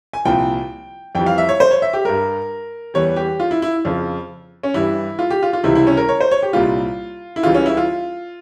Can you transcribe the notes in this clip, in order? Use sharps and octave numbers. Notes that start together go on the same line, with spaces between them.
G#5
C2 A#2 F3 G5
F2 E3 G3 G5
F5
E5
C#5
C5
C#5
E5
G4
G2 G3 A#4
E2 E3 G3 C#5
G4
F4
E4
E4
F2 C#3 F3
C#4
G2 E3 G3 E4
F4
G4
F4
F4
C#2 C3 E3 G3 E4
E4
C#4
A#4
C#5
C5
C#5
G4
C2 A#2 G3 F4
E4
C#2 C#3 E3 G3 F4
C#4
E4
F4